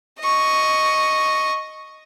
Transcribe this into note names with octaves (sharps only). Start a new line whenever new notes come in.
D#5 C#6